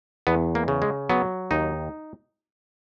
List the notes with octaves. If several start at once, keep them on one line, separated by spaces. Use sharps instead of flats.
E2 B3
A#3
C#3
G#3
F#3 B3
D#2 D#4